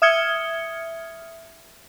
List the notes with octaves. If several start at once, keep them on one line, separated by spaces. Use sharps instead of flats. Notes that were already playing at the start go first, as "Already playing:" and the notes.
E5 D#6 F6 G#6 C#7 G7